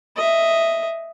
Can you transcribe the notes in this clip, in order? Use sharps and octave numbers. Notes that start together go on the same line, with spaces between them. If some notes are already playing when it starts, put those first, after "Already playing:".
D#5 E5